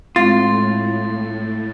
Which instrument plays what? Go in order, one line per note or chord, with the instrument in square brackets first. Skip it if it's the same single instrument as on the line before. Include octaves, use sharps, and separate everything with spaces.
[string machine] A2 [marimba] G#3 C4 [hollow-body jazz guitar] F4 [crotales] A6